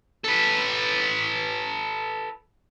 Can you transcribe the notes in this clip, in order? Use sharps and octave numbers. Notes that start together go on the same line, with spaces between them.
A4 B4